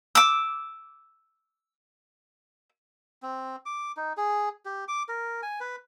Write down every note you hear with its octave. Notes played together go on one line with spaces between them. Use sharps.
D6 E6
C4
D6
D#4
G#4
G4
D6
A#4
G#5
B4